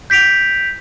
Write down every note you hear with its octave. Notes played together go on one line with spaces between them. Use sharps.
G6 B6 D7 F7